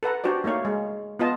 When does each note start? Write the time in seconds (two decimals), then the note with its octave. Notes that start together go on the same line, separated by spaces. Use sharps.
0.03 A4 B4 F#5 A#5
0.24 D4 F#4 G4 C5 D5
0.44 A3 A#3 D#4 C#5 F5
0.65 G#3
1.19 B3 F4 D#5 A5